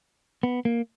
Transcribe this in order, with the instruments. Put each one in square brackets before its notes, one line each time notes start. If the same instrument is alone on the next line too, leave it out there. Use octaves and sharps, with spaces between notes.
[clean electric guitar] B3
A#3